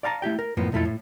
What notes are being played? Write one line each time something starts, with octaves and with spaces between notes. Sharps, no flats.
D5 F5 A5 A#5
A3 E4 G4 G5
A#4
F#2 A2 F3 A#3 B3
B1 F2 A3 E4 F4 A4
A2